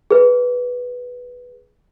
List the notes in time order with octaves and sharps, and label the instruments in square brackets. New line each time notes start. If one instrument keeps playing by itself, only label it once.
[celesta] G#4 B4